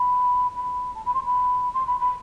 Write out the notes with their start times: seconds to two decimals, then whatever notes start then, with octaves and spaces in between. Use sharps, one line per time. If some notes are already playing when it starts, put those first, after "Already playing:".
Already playing: B5
0.56 B5
0.95 A5
1.05 B5
1.14 C6
1.25 B5
1.74 C6
1.87 B5
2.00 B5